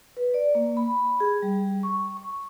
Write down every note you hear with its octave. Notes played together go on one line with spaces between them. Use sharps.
B4
D5
A#3
B5
G#4
G3
C#6
C#6